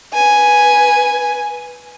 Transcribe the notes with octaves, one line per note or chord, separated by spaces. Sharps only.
B4 G#5